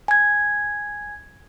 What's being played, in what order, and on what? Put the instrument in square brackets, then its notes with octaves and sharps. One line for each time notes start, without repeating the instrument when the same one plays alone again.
[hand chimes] G#5 G#6